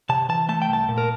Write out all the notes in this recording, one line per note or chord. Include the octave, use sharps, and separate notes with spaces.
C3 A5
E3 A5
A3 A5
G5
C2 A5
A#2
A#4